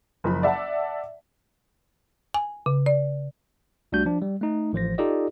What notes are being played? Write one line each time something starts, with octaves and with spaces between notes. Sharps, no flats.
F#1 F3 B5
D5 E5 F#5 A5
G#5
C#3
D5
C2 G3 A3 D4 F#4 G6
F3 D4
G3
A3 D#4
A1 F3 C5 A#6
D#4 F4 G4 A4 D5 D#5